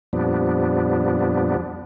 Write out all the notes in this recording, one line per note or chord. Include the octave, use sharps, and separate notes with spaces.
F2 A#2 F3 G3 B3 D4